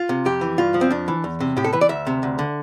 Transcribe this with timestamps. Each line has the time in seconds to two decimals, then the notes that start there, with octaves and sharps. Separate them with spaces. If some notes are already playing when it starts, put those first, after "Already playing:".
Already playing: F4
0.09 C3
0.25 F2 G4
0.41 E3
0.58 G2 F4
0.74 F3
0.81 C4
0.90 F2 D4
1.08 E3
1.24 E2
1.40 C3
1.57 A2 G4
1.64 A4
1.73 E3 B4
1.81 D5
1.89 D2 E5
2.07 C3
2.23 D2
2.39 D3